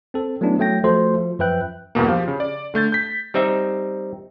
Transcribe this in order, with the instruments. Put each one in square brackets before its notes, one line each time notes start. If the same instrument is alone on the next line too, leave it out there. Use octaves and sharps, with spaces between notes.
[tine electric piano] C4 A4
F#3 A3 B3 C#4 D4 E4
F#3 A3 G5 A#6
F3 A3 F#4 A4 C5 C6
F3
F#2 F3 B4 E5 G5 F#6
[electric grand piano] E2 G2 B2 A#3
F3 G4 F5
C#3
D5
D3 A3 G6 A6
G6 B6
[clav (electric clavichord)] G3 C4 D#4 E5